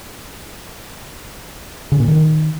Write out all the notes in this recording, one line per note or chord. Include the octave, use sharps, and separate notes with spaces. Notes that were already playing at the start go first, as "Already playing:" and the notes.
C#3
A#2
D#3